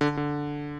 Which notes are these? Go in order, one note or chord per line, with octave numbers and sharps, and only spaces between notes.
D3
D3